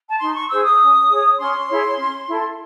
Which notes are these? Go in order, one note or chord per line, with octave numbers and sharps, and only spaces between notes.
A5
D#4 C6
C#6
G#4 C5 E6
D#6
C#4
G#4 C#5
C#4 C6
E4 G#4 C#5
C#4
E4 A4